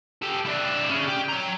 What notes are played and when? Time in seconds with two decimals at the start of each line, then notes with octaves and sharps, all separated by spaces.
0.22 G4 A4
0.45 D4 E4
0.90 C#4 G#4
1.07 G4
1.29 C#5 A#5